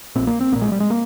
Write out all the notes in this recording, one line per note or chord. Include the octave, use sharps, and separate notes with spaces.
A#1 A#2 C4
A#3
C4
A#1 A#2 A#3
G#3
G3
G#3
A#3